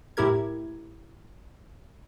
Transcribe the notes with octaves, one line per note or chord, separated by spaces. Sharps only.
A2 E4 G4 A#4 G#6